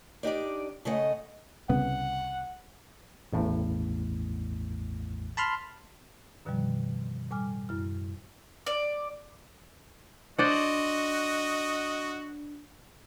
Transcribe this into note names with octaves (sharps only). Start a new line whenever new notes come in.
D4 D#4 G4 D5
C#3 G#3 A3 D#5 F#5
C2 C#3 B3 F#5
A1 E2 A2
A5 B5 C6 F6
F#2 B2 D3 D#3 F3 G3
A2 G3 G#5 D6 F6
F#2 E4 F6
D5
D4 F#4 C5 D5 D#5 F#5